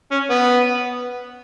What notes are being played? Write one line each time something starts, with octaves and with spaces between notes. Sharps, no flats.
C#4
B3